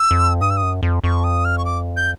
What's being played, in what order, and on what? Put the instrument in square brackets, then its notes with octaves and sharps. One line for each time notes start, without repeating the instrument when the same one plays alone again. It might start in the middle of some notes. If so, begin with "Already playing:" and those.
Already playing: [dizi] E6
[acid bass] F2
[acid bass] G2 [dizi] D#6
[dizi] E6
D#6
[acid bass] F#2
F2
[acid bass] F2 [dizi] C#6
[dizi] D#6
F6
C#6
D6
G6